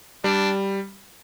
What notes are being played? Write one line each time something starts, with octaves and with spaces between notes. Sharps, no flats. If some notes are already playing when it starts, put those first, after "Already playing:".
G3 D4